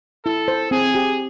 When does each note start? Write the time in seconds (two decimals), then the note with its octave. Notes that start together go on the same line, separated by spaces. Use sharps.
0.25 E4 A4
0.48 C5
0.71 C4 G#4
0.95 G4